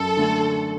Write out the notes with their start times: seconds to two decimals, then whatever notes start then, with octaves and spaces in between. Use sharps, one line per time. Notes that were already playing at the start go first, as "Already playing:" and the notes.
Already playing: F#2 A4
0.17 D3 A3